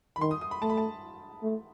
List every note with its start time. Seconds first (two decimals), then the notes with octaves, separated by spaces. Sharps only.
0.16 B5
0.20 D#3 C6
0.31 D#6
0.41 D#6
0.51 B5
0.62 A3 A5
0.70 B5
0.77 A5
1.43 A3